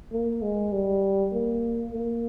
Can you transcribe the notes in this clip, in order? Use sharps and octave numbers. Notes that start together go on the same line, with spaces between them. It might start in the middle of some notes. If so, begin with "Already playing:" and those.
A#3
G#3
G3
A#3
A#3